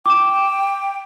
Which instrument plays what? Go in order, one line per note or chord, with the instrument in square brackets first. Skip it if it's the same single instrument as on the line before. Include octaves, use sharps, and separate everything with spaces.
[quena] G5 [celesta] D6 E7